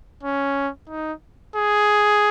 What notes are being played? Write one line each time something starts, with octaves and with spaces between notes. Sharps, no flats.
C#4
D#4
G#4